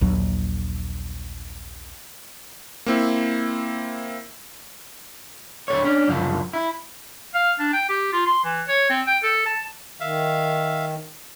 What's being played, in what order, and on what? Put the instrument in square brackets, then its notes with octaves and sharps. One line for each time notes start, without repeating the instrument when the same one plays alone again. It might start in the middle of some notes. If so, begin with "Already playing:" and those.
[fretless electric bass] A#1 D#2 F#3
[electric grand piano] A#3 C4 E4
[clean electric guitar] D2 A4 C#5
C#4 D4
C2 F#2 C#3 F3
E4
[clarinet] F5
D4
G5
G4
F4
C6
E3
C#5
C4
G5
A4
A5
[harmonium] D#3 [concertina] E5 F5